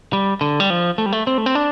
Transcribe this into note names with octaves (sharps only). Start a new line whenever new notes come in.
G3
D3
G3
F3
A3
G3
A3
C4
A3
C4
D4